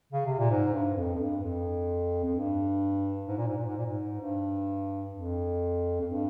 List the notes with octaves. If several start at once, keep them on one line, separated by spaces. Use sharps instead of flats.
C#3
C3
A#2
G#2
G2
F2
F2
G2
F2
F2
G2
G#2
A#2
G#2
A#2
G#2
A#2
G#2
G2
F2
F2
G2